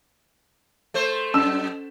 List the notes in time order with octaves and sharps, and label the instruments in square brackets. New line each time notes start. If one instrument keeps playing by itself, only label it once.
[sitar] A3 C5
[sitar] F#2 [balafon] C#4 [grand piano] E6 E7